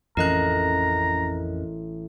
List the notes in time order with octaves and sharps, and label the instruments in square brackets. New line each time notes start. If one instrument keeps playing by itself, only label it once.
[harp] A1 [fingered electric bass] F2 C4 C#4 [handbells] A#4 D#5 F#6 [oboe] A#5